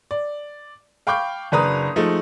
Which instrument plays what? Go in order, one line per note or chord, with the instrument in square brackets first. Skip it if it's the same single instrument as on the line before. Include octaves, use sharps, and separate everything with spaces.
[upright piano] D5
F5 G5 B5 C#6 D6 G6
F#1 D4 B4 A#5 D#6
F3 G#3 A3 D#4